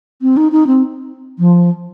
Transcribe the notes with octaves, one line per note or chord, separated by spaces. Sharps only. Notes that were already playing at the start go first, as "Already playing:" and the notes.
C4
D#4
D#4
C4
F3